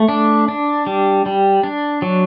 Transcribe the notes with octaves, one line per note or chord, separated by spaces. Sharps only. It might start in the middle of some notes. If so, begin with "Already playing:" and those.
Already playing: A3
D4
D4
G3
G3
D4
F#3